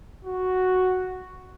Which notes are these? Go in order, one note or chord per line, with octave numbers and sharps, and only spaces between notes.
F#4